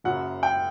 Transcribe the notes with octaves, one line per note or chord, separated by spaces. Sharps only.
F#1 F#2 C#3 F#3 F#5
G5